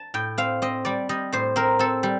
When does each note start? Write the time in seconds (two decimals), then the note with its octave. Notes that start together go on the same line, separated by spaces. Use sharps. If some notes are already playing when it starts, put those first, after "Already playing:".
Already playing: A5
0.14 A2 G5
0.38 C4 F5
0.62 C4 D#5
0.85 G3 D5
1.09 G3 D#5
1.32 A2 C5
1.56 C4 A#4
1.79 C4 A4
2.03 G3